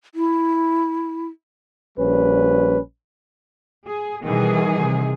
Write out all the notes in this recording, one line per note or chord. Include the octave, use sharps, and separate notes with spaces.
E4
A#1 G3 C#4 B4
G#4
B2 D#3 E3 G3 G#4
C3